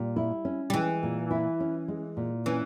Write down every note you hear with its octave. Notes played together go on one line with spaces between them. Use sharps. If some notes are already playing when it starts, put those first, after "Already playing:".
Already playing: A#2 G3
E4
C#4
G3
E3 G#3
A#2
E4
C#4
G#3
A#2
E3 C#4